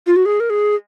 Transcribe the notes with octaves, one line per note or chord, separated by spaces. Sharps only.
F4
F#4
G#4
A#4
G#4